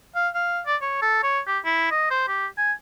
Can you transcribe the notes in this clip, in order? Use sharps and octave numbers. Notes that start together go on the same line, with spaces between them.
F5
F5
D5
C#5
A4
C#5
G4
E4
D#5
C5
G4
G#5